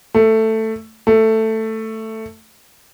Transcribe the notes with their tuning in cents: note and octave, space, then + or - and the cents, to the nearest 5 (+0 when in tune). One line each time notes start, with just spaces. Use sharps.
A3 +10
A3 +10